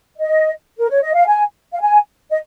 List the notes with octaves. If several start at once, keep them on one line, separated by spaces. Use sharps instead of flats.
D#5
A#4
C#5
D#5
F5
G#5
F5
G#5
D#5